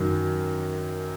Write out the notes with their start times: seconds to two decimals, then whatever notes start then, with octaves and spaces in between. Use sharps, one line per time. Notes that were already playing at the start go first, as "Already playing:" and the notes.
Already playing: F#2 D#3 F#3